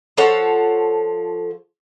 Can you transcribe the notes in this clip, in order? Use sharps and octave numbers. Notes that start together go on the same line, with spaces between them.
F3 A4 C#5 F#5